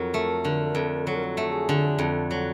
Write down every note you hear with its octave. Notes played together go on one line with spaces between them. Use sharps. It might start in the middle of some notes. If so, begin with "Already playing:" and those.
Already playing: F2 F#3 A#4
A3
D3
F2
F#3 A4
A#4
A4
A3
G#4
D3
F2
F#3